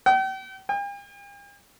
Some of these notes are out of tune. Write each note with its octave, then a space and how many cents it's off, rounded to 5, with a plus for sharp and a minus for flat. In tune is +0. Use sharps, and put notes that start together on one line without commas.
G5 -40
G5 +45